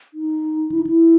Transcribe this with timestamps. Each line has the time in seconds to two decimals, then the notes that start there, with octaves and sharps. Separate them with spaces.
0.14 D#4
0.72 E4
0.79 D#4
0.87 E4